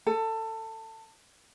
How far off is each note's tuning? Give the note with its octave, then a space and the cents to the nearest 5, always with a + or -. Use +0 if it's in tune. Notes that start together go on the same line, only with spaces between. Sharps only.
A4 +20